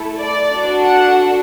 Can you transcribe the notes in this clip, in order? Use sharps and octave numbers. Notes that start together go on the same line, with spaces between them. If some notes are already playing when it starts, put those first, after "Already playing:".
Already playing: A3 E4 A4
D5
D4 F#4 A4
F#5